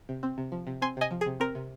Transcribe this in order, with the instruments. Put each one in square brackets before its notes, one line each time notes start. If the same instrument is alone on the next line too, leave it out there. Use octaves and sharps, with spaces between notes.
[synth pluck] C3
C4
C3
F3
C3
C4 G#5 C6
C3 D#5 G#5
F3
G#4
C3
C4 A#4
C3